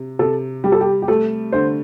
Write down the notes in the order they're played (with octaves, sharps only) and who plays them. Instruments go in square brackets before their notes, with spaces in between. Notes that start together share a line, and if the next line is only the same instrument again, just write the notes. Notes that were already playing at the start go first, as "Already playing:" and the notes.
Already playing: [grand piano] C3
[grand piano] C3 [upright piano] A4
[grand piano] G3 [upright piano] G4
[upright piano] A4
G4
G4
[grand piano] A3 [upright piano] A4
[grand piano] D3 [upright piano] C5